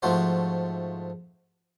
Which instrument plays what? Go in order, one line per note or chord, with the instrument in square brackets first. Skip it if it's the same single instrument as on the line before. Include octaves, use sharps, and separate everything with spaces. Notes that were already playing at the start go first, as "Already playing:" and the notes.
[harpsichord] G#2 F3 A3 F#4 C5 D5